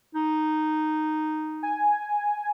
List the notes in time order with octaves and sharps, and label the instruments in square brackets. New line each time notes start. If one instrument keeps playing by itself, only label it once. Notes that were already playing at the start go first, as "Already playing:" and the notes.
[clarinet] D#4
[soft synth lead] G#5